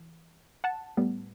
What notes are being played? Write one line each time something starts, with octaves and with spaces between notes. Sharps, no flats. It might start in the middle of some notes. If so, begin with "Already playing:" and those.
Already playing: E3
F#5 A5
A2 G3 B3